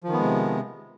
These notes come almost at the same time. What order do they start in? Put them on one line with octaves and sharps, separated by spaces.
F3 D#3 B3 G#3 C3